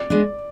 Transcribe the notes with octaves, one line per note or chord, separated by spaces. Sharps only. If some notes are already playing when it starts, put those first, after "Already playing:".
Already playing: D5
G#3 B3 D4